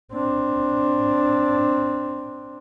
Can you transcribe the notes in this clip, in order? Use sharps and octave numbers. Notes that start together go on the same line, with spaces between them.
C4 D4